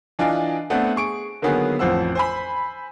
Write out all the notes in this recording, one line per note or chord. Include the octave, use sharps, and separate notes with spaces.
E3 D4 F4 D5 D#5 G#5
A3 B3 C4 D4 F#5
G#4 C#6 D7
D3 D#3 F#3 A#3 B3 G#4
A1 F2 F3 C5 F#5 E6
C5 G#5 B5